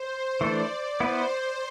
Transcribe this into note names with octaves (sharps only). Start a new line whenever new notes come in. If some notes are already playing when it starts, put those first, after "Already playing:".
Already playing: C5
C5
E3 A3 D4 A4 D5
B3 E4 B4 C5